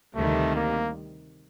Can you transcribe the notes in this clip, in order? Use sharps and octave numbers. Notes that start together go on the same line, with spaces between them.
D2 C3 D#3 G3 A3
A#3